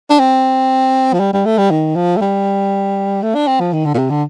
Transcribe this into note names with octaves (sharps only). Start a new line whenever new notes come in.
D4
C4
F3
G3
G3
A3
G3
D#3
F3
A3
G3
A3
D4
C4
F3
D#3
D3
A#2
C3
D3